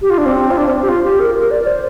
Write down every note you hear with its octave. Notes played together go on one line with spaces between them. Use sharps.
G4
F4
D4
C4
F4
D4
C4
G4
F4
G4
A#4
A#4
D5
C5